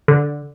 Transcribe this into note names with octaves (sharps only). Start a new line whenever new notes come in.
D3